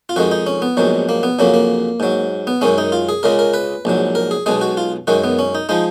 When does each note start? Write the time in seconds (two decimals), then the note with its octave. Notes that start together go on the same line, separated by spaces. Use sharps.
0.09 F4
0.16 F2 D#3 G#3 F#4
0.31 D#4
0.46 C#4
0.62 B3
0.77 A#1 G#2 D#3 F#3
1.09 A#3
1.23 B3
1.39 F2 C#3 F#3 A#3
1.54 A#3
2.00 G#2 F#3
2.47 B3
2.61 F#2 D#3 G#3 C#4
2.78 D#4
2.92 F4
3.09 G#4
3.23 C#2 C#3 G#3 A#4
3.39 A#4
3.54 B4
3.85 A#1 G#2 F#3
4.15 A#4
4.31 G#4
4.46 B1 B2 G#3 G#4
4.61 F#4
4.77 F4
5.07 F#2 D#3 G#3 F#4
5.24 B3
5.39 C#4
5.55 D#4
5.69 F3 G#3 D#4